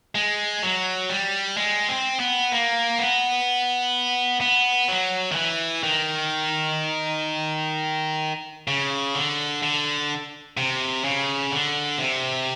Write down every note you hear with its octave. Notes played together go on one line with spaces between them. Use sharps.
G#3
F#3
G3
G#3
C4
B3
A#3
B3
B3
F#3
D#3
E3
D#3
C#3
D3
D3
C3
C#3
D3
C3